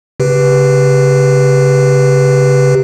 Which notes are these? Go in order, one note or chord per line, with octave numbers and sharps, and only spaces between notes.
C#3 G4 B4